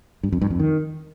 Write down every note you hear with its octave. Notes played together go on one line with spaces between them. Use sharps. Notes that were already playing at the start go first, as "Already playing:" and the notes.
G2
F2
G2
F2
D#3